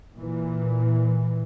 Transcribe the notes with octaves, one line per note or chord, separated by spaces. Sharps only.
A#2 E3